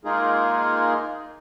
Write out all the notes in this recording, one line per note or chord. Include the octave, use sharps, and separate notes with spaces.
G#3 A#3 D#4 F4 G#4 A#4